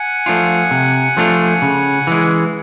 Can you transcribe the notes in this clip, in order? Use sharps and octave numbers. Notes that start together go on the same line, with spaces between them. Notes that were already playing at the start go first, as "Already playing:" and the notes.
Already playing: F#5 G#5
F3 A3 D4 F4
C3
F3 A3 D4 F4
C#3
E3 G#3